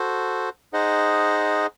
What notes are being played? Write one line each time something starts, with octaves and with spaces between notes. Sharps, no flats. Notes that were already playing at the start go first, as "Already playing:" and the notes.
Already playing: F#4 A4 C5
D#4 G#4 C5 D#5 F#5